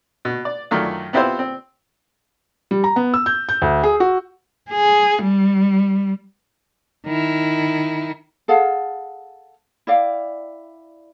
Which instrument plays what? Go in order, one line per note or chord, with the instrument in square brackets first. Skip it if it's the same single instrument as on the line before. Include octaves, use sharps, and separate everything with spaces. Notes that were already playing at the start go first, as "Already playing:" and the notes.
[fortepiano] B2
D5
F#2 D#3 F#3 A3 D4 F4
B3 C4 E4 F4 G4 C5
C4
[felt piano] G3
A#5
B3
E6
G6
G6
D2
G#4
F#4
[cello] G#4
G3
[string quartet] D#3 E4
[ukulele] G#4 A4 F5 F#5
E4 D5 F5 G5